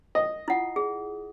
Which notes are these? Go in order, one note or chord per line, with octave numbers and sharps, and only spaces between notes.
D#5
E4 F4 F#5
G#4